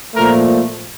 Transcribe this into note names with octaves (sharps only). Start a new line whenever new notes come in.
A#2 F3 A3 A#4